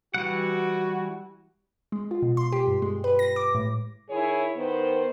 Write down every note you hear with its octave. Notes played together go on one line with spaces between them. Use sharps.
E3 G3 F#4 F#5
G#3
F4
B2
C6
G4
G2
G#3
B4
A#6
D6
A2
D#3 E4 G#4 C#5
D#3 B3 C5